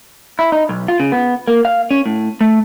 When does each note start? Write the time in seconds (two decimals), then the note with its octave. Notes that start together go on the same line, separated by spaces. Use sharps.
0.39 E4
0.52 D#4
0.69 B1
0.88 F4
1.00 C#3
1.12 B3
1.48 A#3
1.65 F5
1.91 C#4
2.06 A2
2.41 A3